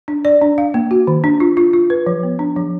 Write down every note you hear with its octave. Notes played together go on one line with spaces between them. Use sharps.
D4
D5
D4
F5
A#3
F#4
D#3
D4
F4
F4
F4
B4
F3
B3
D4
F3